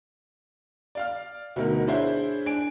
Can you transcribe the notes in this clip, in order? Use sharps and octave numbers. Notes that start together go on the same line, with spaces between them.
D5 F5 F6
D2 B2 D#4 F#4 A#4
D4 E4 G#4 C5 C#5 E5
D4 G#5 D7